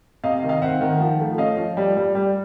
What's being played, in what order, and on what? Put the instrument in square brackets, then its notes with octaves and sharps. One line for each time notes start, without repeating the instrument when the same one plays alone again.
[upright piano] C3 D#5 F5
D#3
D#5 F5
C4 E5 F#5
D#3
F3
A3
C#4 D#5 F5
F3
G3
G3
G3